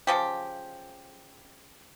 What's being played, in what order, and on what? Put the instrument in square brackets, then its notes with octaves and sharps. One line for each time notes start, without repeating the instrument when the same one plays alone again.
[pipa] C#3 F3 G4